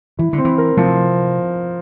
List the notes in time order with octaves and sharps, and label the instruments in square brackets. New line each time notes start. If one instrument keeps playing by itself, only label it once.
[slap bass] E3 [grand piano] E4
[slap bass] D3
[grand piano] C4
[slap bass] E3
[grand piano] A#4
[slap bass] C3 [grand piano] F3